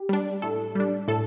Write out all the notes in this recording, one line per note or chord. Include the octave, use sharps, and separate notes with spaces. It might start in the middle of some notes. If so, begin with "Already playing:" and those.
Already playing: G4
G3 D4
A2 A4
G3 D4
A2 A4